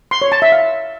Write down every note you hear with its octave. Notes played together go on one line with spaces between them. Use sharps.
C6
C#5
A5
E5
F5